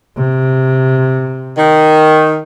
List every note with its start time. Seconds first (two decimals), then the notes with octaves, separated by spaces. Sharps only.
0.17 C3
1.58 D#3